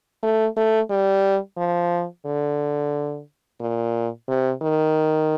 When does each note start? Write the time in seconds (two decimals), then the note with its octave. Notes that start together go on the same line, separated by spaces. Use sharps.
0.23 A3
0.57 A3
0.90 G3
1.58 F3
2.26 D3
3.61 A#2
4.29 C3
4.62 D#3